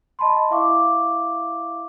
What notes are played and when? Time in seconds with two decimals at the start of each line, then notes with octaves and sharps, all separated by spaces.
0.19 D#5 A5 B5 C6
0.51 E4 E5 F5 C#6 D6